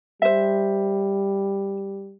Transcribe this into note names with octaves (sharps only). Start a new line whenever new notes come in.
G3 C5 E5